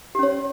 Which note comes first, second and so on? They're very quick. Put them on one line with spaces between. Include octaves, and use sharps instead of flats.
G4 C#4 C#5